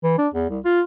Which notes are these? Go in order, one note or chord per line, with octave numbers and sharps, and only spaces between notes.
E3
D4
E2
C2
F4